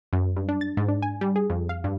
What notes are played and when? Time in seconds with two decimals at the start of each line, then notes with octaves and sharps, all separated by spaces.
0.13 F#2
0.36 G2
0.49 D4
0.61 A6
0.77 G#2
0.88 D4
1.02 G#5
1.21 G3
1.36 G#4
1.50 F2
1.69 F5
1.84 G2